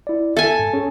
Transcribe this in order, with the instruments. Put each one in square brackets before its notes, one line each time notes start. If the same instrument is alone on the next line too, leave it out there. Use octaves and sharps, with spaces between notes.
[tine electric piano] E4 D5
[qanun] A4 G#5 [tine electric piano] E5
[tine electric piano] G#2
C#4 G#4